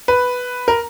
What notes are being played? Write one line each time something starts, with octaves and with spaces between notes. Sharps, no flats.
B4
A#4